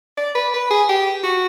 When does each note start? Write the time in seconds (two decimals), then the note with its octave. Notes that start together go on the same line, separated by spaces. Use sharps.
0.17 D5
0.35 B4
0.54 B4
0.70 G#4
0.89 G4
1.23 F#4